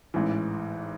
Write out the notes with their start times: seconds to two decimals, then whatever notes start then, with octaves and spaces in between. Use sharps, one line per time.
0.14 A1 G#2 E3